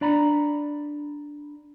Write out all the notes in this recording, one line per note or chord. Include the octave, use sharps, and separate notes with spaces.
D4 D5 A#5 B5